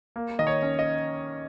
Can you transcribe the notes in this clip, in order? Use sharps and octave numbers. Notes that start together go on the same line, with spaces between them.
A#3
D#3 D#5
C#5
C#4
D#5